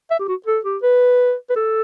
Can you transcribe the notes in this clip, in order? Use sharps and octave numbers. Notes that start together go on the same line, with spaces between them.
E5
G4
F#4
A4
G4
B4
B4
A4